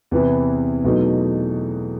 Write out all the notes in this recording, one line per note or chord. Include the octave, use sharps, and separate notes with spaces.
E2 C3 E3 B3 E4
E2 B2 F#3 A3 D#4